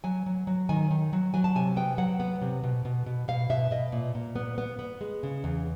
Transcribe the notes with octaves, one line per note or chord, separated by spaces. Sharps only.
F#3 G#5
F#3
F#3
D#3 G#5
D#3
F#3
F#3 G#5
A5
C3 G#5
B3 G5
F#3 F#5
B3
C3
B2
B2
B2
B2 F5
B2 E5
B2 D#5
A#2
A#2
B3
B3
B3
G#3
C#3
E2